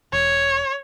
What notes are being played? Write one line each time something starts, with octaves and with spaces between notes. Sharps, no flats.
E1 C#5